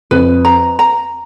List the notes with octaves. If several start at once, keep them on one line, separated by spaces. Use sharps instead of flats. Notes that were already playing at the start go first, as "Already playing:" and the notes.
F2 B4
A#5
A#5